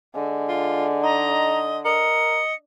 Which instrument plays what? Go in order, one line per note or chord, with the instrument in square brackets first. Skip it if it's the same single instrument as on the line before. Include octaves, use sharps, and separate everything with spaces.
[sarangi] D3 [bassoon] G#3
[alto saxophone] F4
[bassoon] D#4 [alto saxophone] D#5 [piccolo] A#5
[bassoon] A#4 [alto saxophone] D#5 [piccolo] C#7